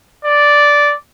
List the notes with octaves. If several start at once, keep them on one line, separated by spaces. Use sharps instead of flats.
D5